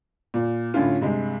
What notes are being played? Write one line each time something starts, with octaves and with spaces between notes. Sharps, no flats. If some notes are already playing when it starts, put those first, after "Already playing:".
A#2
A2 D3 C#4 E4 F4
G2 C3 G#3